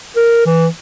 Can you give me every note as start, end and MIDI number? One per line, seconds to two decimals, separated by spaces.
0.16 0.45 70
0.46 0.66 52